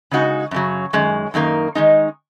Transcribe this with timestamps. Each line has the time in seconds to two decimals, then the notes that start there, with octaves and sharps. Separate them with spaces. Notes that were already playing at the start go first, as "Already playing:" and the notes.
0.11 C#3 G#3 D#4 F#4
0.51 F#2 C#3 F#3
0.93 F#2 D#3 G#3
1.34 F#2 D#3 A#3 D#4 A#4
1.75 D#3 G#3 D#4